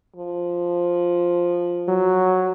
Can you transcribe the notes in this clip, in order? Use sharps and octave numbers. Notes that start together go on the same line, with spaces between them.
F3
F#3